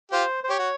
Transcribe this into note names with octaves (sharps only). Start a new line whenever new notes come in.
F4 G4 C5
C5
G4 C#5
F#4